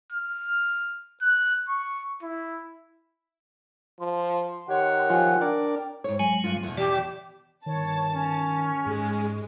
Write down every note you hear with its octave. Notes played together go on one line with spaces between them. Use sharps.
F6
F#6
C#6
E4
F3 C6
D#3 G4 C#5 F#5
F3 F4 G#5
D4 A#4 D5 G5
G#2 C#5
F#3 G#3 G#5
G2 F4
E2 B2
E3 G4 D5
G1 D#3 C#5 A5
C#4
G#2 G#3